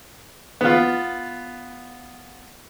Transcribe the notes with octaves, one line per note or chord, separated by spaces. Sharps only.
B3 F4